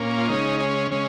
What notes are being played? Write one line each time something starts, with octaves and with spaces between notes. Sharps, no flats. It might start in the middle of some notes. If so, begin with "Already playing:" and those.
Already playing: A#2 A#3 C#4
F4
C#3 G#3 C#4 D#4
C#4
C#3 G#3 C#4